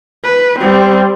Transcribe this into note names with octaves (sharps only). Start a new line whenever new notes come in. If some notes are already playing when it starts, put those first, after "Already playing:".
B4
G3 C4